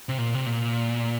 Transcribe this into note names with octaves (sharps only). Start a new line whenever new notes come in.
C3
A#2
C3
A#2